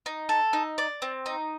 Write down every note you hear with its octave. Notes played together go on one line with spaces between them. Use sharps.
D#4
A4
D#4
D5
C4
D#4